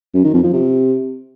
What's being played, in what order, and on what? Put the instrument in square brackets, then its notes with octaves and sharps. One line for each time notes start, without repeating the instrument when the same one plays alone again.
[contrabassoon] F#2
D#3
F2
F3
C3